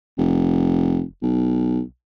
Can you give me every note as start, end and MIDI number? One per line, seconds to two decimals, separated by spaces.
0.18 1.02 29
1.23 1.81 35